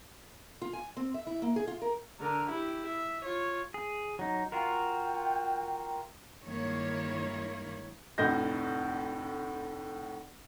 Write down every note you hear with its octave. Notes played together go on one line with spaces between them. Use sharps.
F4
G#5
C4
E5
E4
A#3
G#4
F4
A#4
D3 A#4
E4 G4
E5
F4 C#5
G#4
F#3 D#4
F4 F#4 A#4 G5
G2 D#3 G#3 A#3 E4 C#5
F1 D2 A2 D#5 G6 A#6